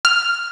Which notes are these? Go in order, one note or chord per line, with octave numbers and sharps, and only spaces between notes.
F6